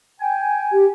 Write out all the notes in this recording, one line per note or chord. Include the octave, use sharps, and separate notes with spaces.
G5 G#5
G4